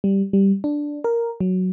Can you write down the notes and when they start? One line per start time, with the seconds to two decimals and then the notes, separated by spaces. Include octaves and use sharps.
0.04 G3
0.33 G3
0.64 D4
1.04 A#4
1.40 F#3